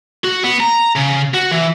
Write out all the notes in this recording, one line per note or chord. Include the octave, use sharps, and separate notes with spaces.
F#4
B3
A#5
C#3
F#4
E3